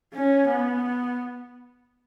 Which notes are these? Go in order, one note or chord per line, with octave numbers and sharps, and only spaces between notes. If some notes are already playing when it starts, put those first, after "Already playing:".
C#4
B3